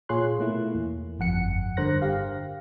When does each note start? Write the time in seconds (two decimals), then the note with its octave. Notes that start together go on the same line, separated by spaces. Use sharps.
0.09 A#2 F4 G#4 C#5 C6 F#6
0.39 B2 A3 A#3 E4
0.75 E2
1.19 G1 F2 F#5 C#7
1.77 G2 D3 A#4 C5 F#6 A#6
2.02 G4 F5